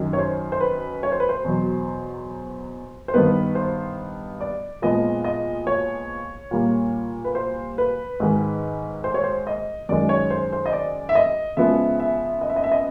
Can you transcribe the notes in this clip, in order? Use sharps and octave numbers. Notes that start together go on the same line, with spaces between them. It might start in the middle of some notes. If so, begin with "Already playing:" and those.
Already playing: F#2 D#3 F#3
C#5
C5
C5
B4
C#5
C5
B4
C5
E2 B2 F#3
C5
G2 D#3 G3 B3 B4
C5
D5
A#2 F3 G#3 B3 D#5
D#5
C#5
A#2 G3 A#3
B4
C5
B4
G#2 D#3 G#3
C5
C#5
C5
D#5
F#2 D#3 G#3 D5
C#5
C5
C5
D#5
D5
E5
D#5
C#3 F3 G#3 B3 E5
E5
D#5
E5
D#5
E5
D#5